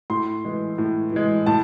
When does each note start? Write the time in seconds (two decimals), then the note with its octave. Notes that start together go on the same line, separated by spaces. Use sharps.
0.10 A2 C6
0.44 E3 G#3
0.78 A2
1.12 E3 G#3
1.46 A2 A5